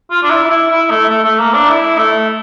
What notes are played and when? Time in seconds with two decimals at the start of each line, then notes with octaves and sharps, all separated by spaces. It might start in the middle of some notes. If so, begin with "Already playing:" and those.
0.11 F4
0.23 D4
0.30 E4
0.50 E4
0.70 E4
0.90 A3
1.09 A3
1.24 A3
1.39 A#3
1.54 D4
1.69 E4
1.98 A3